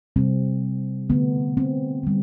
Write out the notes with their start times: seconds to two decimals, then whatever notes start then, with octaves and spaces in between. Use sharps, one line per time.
0.16 C3 G3 C4
1.10 D3 A3 B3
1.57 C4
2.03 D3 G3